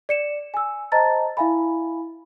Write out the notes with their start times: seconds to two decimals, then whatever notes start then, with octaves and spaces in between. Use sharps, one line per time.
0.09 D5 C#7 E7
0.54 G#5 E6
0.92 C5 D#5 A5 A#5 A6
1.37 E4 E5 F5 G#5 B5